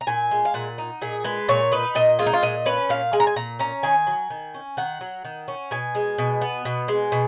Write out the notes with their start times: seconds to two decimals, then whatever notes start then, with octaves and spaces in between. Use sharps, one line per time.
0.01 A#5
0.07 A#2 G#5
0.31 G#3
0.45 F5
0.54 A#2 F#5
0.78 D#4
1.02 A#2 G#4
1.24 G#3 B4
1.48 A#2 C#5
1.72 D#4 B4
1.95 A#2 D#5
2.19 G#3 F4
2.26 D#4
2.33 F4
2.43 A#2 D#5
2.66 C#4 B4
2.89 A#2 F5
3.13 G#3 G#5
3.20 A#5
3.27 G#5
3.36 A#2 A#5
3.59 C#4 A#5
3.83 D#3 G#5
4.07 F#3
4.30 D#3
4.54 C#4
4.77 D#3 F#5
5.01 F#3
5.25 D#3
5.48 C#4
5.71 B2 G#5
5.95 G#3
6.18 B2
6.41 B3
6.65 B2
6.88 G#3
7.12 B2